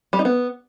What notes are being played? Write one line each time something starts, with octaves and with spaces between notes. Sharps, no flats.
G3
D#4
B3